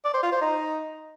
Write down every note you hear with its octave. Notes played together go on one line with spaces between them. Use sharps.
D5
C5
F4
C5
D#4